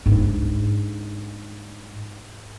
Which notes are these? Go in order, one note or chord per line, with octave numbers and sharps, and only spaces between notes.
G#2 D4